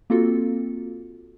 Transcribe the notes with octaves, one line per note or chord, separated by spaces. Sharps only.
A#3 C4 F4 F#4 A4